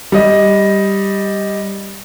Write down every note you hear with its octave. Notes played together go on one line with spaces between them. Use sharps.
G3 D#5